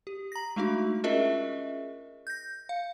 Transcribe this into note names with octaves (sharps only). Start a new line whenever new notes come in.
G4
A#5 A#6
G#3 A3 D4 D#4 F#4
C#4 F4 G#4 A#4 D#5 E5
G6 A#6
F5